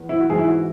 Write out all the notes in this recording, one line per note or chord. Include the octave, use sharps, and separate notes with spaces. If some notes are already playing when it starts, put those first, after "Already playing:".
Already playing: E2
E4
F#4
G#2 E3 G#4
E4
F#4